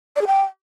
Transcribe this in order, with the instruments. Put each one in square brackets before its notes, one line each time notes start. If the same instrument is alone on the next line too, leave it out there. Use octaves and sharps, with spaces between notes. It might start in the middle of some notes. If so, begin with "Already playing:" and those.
[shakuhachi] D5
G#4
G5